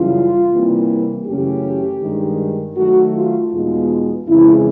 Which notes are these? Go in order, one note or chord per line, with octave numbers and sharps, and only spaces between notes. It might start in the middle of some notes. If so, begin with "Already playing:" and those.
Already playing: F#2 C#3 E3 G3 F4
C3 E3 G3 A#3
F#2 C#3 E3 A3 C#4 G4
G2 D#3 G#3
D#3 F#3 A3 F#4
F4
E2 B2 G#3 B3 D#4 F4
F2 C#3 E3 G#3 E4